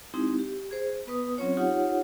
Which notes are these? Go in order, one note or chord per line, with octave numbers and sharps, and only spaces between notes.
G#3 C4 D#4 E4 G4
G4
G#4 C5
B3 B4 D#6
F#3 C4 C#4 F4 C#5
D#4 F4 G4 C#5 F#5